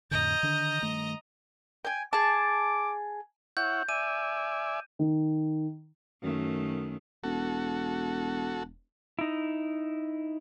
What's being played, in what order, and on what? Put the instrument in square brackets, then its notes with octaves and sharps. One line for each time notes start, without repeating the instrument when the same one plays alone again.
[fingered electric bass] F2 A2 D3 [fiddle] D#5 A#5 [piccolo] G6
[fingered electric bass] D3 D#3 D4
G2 D#3 A3
[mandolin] G5 G#5
[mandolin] G#4 A5 [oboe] D6
[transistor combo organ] E4 C#5 F#5 [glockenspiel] G6
[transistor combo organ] D5 E5 G#5 [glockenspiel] D#7
[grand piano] D#3
[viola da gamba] F#2 D#3 A3
[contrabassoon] E1 [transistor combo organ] F#4 A4
[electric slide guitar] D#4 E4